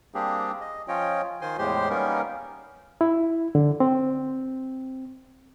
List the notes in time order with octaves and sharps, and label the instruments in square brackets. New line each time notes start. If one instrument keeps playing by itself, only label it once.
[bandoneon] G3 A#3 C4 D4 G4 G#4
D#5
F3 C#4 F4 C#5 D#5 G5
D#3 F4 C5 G#5 C6
E2 A2 G#3 G4 C5 C6
G3 A#3 B3 C#4 D#4 A#4
[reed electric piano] E4
D3
C4